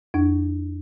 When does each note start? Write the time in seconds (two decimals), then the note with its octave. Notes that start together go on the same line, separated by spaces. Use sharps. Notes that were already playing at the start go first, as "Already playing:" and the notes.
0.14 F2 D4